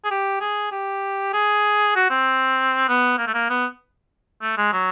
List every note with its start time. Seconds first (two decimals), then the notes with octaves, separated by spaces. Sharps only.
0.04 G#4
0.11 G4
0.41 G#4
0.72 G4
1.33 G#4
1.96 F#4
2.10 C4
2.88 B3
3.18 A#3
3.27 A3
3.34 A#3
3.50 B3
4.42 A3
4.58 G#3
4.73 F#3